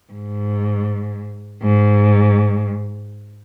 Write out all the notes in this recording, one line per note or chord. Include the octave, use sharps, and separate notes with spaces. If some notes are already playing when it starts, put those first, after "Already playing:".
G#2
G#2